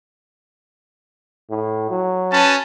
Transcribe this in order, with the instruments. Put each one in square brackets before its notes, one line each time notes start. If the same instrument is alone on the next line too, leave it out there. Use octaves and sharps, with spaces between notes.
[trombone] A2
F#3
[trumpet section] C#4 B4 A5